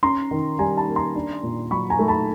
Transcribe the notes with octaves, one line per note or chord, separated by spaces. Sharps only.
C#4 A#5 C6
D#3
G3 G#5 A#5
A5 B5
A#3
A#5 C6
D4
A#2
F#3 B5 C#6
G#5 A#5
A3
A5 B5